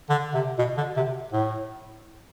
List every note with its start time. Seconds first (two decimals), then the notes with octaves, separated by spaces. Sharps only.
0.09 D3
0.34 C3
0.59 B2
0.77 D3
0.96 C3
1.32 A2